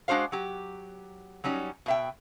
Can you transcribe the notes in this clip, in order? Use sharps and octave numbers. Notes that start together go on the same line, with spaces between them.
G#3 D4 F#4 C5 F5
F#3 G4
F#3 G3 C#4 D#4
B2 E5 G5